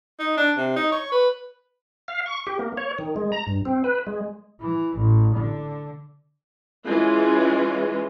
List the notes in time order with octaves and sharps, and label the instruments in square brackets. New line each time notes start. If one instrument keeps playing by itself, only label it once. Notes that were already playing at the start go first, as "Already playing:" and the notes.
[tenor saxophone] D#4
D4
C3
D#4
C#5
B4
[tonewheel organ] F5
C#6
G4
A#3
C#5
D#3
G#3
A#5
G2
C4
B4
G#3
[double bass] E3
A1
D3
[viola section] E3 G#3 C#4 F4